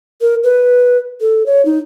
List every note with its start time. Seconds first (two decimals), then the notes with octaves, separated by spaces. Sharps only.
0.21 A#4
0.44 B4
1.21 A4
1.46 C#5
1.65 D#4